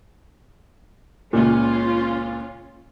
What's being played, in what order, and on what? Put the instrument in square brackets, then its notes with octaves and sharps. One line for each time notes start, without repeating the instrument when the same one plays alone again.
[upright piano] C#2 A#2 [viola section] C#4 F4